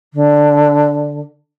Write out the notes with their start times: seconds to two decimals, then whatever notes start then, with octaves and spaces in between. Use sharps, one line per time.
0.13 D3